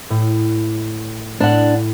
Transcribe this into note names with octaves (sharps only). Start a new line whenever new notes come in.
A2
A2 D4 F#5